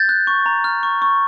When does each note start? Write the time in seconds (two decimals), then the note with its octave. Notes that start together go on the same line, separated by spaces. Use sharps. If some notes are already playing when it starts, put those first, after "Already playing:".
Already playing: G6 A6
0.09 F#6
0.27 C#6
0.46 A#5
0.64 F6
0.83 C#6
1.02 C#6